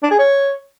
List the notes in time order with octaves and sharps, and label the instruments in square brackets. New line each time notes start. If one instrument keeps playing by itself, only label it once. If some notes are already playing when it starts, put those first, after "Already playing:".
[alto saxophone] D4
G#4
C#5